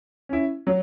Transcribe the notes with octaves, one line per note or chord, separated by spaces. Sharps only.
C#4 E4
F#3